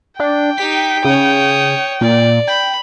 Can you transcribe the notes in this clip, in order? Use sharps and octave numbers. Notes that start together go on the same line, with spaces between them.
D4 G5
D#4 G4 B6
C#3 C#5 D#6
A#2 D5
G5 B5